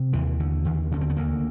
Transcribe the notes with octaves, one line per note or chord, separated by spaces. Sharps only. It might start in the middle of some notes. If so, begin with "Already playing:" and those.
Already playing: C3
D#2 E3
D3
D#2
D3 C#4
C4
B3
D2 A#3